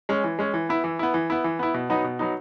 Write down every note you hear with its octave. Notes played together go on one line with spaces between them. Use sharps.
G#3 C#4
E3
G#3 C#4
E3
B3 E4
E3
B3 E4
E3
B3 E4
E3
B3 E4
B2
F#3 B3 D#4
B2
F#3 B3 D#4